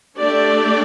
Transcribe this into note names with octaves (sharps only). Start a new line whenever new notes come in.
A3 D4 G4 D5